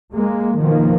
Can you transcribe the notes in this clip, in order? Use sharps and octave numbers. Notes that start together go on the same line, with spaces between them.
G#3 A#3
B2 D#3 F3 A#3